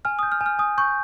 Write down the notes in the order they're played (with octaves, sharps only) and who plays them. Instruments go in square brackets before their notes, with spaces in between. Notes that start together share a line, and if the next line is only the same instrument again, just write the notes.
[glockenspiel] G#5 [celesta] F6
[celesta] D#6 [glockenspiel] G6
[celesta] F6
[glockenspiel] G#5
[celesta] F6
[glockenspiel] G#5 [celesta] D#6
[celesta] C#6 [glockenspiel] G6